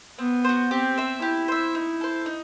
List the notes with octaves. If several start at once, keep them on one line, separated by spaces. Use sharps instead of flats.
B3 C4
F#4 C5
C4 G4
C5 E5
E4 G4
C5 E5
D#4
A4 C5
D#4